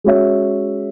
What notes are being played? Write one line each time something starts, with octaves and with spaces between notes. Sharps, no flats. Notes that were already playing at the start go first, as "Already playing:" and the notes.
G#3 C#4 F#4 C#5 E5